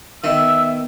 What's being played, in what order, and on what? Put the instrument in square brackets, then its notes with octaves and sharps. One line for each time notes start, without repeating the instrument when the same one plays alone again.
[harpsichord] D#3 [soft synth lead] B3 [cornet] E5 [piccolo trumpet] E6